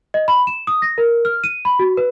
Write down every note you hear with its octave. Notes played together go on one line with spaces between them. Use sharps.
D#5
B5
E7
D#6
A#6
A#4
F6
D#7
B5
F#4
B4